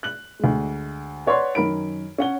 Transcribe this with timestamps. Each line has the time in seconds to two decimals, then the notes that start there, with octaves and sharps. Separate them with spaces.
0.03 F#6 F#7
0.40 D2 G#3
1.27 B4 C#5 D5 F#5 C6
1.55 F#2 D#3 A#4 B5 D7
2.18 C#4 F#5 G7